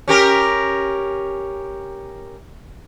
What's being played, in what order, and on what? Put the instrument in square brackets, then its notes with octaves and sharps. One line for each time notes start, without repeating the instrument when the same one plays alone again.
[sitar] C#4 G4 A#4